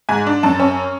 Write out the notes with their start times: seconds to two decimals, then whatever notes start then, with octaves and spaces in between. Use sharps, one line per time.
0.09 G#2 G#5
0.27 D4
0.43 F#2 A5
0.60 C#4